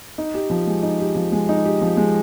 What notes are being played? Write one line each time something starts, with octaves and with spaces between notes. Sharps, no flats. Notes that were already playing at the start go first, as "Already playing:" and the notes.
D#4
G4
F3
G#3
D#4
G4
F3
G#3
D#4
G4
F3
G#3